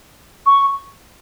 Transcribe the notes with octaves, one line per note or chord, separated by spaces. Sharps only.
C#6